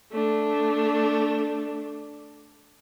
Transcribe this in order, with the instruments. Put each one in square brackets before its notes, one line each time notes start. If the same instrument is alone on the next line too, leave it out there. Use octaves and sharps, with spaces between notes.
[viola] A3 D4